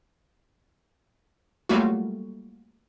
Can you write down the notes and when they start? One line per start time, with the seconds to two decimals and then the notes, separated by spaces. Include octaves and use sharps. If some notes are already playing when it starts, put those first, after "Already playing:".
1.69 F#3 G3 A3 A#3 F4 F#4